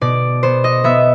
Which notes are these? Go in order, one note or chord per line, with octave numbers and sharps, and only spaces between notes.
B2 D5
B3 C5
D#5
B3 E5